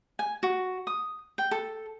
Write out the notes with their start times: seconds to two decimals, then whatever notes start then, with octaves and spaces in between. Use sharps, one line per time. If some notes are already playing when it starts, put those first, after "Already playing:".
0.19 G#5
0.43 F#4
0.87 D#6
1.38 G5
1.51 A4